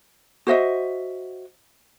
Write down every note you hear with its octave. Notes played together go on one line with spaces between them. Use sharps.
F#4 C5 D#5 E5